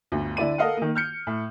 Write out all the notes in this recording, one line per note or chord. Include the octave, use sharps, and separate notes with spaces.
G1 D2
D3 E4 D5 D#7
A4 A#4 D#5 F5 F#5
D#3 A#3
F6 G6 C#7
A2